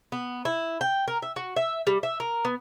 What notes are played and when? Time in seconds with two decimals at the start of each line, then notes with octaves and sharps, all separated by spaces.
0.12 B3
0.45 E4
0.81 G5
1.08 A#4
1.22 E5
1.36 F#4
1.56 E5
1.87 G3
2.03 E5
2.20 A#4
2.45 B3